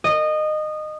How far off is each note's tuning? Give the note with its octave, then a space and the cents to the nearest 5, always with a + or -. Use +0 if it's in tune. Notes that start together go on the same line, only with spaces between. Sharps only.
D#5 -20